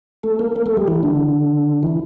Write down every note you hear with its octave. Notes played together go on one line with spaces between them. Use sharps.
A3 A4
A#3 A#4
A#3 A#4
A3 A4
G3 G4
E3 E4
D3 D4
E3 E4